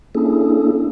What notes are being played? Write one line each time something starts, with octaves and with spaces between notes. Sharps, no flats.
A#3 C#4 D4 E4 G#4 A4